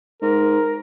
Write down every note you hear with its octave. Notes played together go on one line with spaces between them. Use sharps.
G#2 A#4